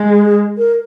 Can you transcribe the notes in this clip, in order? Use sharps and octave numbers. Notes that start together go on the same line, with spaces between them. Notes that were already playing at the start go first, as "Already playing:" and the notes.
Already playing: G#3
G#4
G#4
A#4